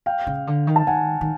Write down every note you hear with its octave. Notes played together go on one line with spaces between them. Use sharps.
F5 G5
C#3
D3
D#3
A5
D#3 F#5 G#5
D#3